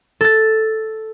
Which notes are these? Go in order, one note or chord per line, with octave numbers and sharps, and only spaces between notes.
A4 A6